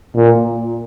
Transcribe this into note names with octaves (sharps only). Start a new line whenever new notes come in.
A#2